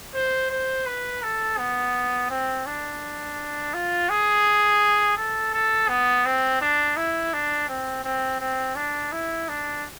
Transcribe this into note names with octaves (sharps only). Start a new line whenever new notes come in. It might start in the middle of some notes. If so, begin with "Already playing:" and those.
C5
C5
B4
A4
B3
C4
D4
F4
G#4
A4
A4
B3
C4
D4
E4
D4
C4
C4
C4
D4
E4
D4